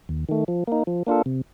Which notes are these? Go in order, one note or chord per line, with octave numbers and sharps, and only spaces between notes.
D#2
D#3 A3
F3
A#3 D#4
F3
A#3 D4 F4 A4
C3